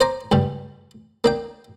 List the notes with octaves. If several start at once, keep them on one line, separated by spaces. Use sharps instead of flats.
C5 G#5 A#5 D6
C#2 G2 G3
A#3 D4 G5